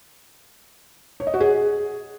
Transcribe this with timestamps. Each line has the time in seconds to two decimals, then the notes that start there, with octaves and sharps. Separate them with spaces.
1.20 C#5
1.27 D#5
1.34 F#4
1.41 G#4